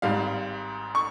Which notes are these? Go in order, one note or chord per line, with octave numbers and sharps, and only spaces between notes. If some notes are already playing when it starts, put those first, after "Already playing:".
G#1 G#2 G3 F5
C#6